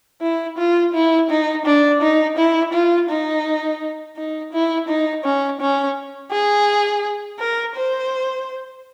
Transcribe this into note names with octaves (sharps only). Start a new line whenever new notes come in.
E4
F4
E4
D#4
D4
D#4
E4
F4
D#4
D#4
E4
D#4
C#4
C#4
G#4
A#4
C5